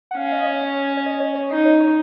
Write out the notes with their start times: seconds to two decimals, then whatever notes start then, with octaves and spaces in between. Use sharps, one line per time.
0.11 F#5
0.17 C#4 F5
0.32 D#5
0.47 C#5
0.97 C#5
1.06 D#5
1.20 C#5
1.35 C#5
1.50 D#4 D#5
1.65 C#5
1.80 C#5